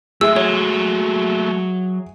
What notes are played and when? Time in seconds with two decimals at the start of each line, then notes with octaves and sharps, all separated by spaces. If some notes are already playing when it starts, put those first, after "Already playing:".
0.21 G#3 A3 G#4 E5 E6
0.36 F#3 C#5